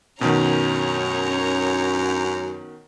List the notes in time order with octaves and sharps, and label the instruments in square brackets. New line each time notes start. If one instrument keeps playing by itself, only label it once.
[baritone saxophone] F#2 [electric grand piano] B2 D#3 [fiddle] C#4 A#5